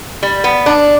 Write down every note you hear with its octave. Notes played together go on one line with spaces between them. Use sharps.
G3
B3
D4